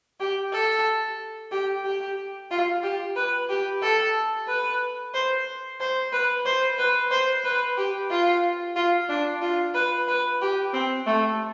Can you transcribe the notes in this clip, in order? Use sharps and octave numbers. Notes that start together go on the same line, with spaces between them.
G4
A4
G4
G4
F4
G4
B4
G4
A4
B4
C5
C5
B4
C5
B4
C5
B4
G4
F4
F4
D4
F4
B4
B4
G4
C4
A3